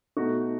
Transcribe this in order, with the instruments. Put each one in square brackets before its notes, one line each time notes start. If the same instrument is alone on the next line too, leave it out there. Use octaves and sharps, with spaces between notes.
[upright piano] B2 A3 D#4 F#4